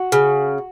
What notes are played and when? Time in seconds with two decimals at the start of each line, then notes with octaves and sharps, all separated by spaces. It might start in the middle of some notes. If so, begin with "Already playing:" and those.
Already playing: F#4
0.12 C#3